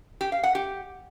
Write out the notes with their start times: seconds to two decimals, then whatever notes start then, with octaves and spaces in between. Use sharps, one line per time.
0.21 G4
0.32 F5
0.43 F#5
0.55 G4